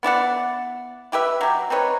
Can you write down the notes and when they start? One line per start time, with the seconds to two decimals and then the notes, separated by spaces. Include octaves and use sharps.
0.03 B3 E4 D5 F#5
1.12 E4 G4 B4 E5
1.41 F#3 G4
1.70 C4 D#4 B4 C#5